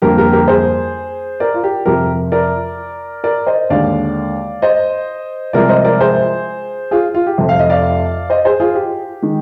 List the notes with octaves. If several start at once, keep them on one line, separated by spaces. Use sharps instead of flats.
F2 D3 G3 A#3 G4 A#4
G4 A#4
G4 A#4
G#4 C5
A#4 D5
F4
G4
F2 C3 F3 G4 A#4
A#4 D5
A#4 D5
C5 D#5
D#2 D3 G#3 D5 F5
C5 D#5
C2 C3 F3 G#3 A#4 D5
C5 D#5
A#4 D5
G#4 C5
F4 G#4
F4
G4
F1 F2 C3
F5
D#5
D5 F5
C5 D#5
G#4 C5
F4 G#4
G4
D#3 G#3